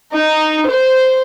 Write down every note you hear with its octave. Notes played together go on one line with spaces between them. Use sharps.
D#4
C5